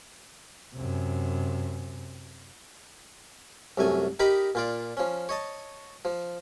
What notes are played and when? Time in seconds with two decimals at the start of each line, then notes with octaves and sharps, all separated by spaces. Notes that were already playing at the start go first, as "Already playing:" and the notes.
0.75 F#2 C3
3.78 C2 F#2 A3 G#5
4.19 D#4 G4 A#4 D#5 A#5 B5
4.55 A#2 F4 D5
4.97 F3 C#4
5.29 C#5 D#5 A5
6.05 F3